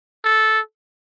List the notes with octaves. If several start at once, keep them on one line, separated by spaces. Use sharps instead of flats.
A4